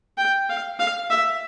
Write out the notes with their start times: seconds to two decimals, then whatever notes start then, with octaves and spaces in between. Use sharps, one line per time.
0.18 G5
0.49 F5
0.80 F5
1.10 E5